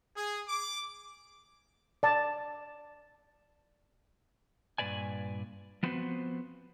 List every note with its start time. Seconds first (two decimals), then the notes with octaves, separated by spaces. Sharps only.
0.16 G#4
0.48 D6
2.03 D5 A5
4.78 G2 A#2 B4 D5 G#5
5.83 F3 B3 C4 F#4 B4 C5